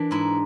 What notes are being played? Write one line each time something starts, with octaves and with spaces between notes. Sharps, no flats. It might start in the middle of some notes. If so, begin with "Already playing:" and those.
Already playing: E3 D4
G#2 E4